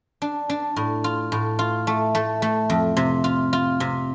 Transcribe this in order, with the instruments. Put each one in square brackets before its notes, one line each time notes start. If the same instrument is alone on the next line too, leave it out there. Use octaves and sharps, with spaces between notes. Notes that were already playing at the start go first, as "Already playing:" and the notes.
[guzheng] D4
D4
A2
F4
A2
F4
A3
A3
A3
F2
C3
F4
F4
C3